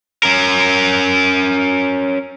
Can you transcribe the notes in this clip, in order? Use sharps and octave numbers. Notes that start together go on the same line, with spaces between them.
C#4 A#4